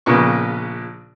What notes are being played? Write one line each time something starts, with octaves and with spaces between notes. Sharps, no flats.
A#1 A#2 C#3 B3 C#6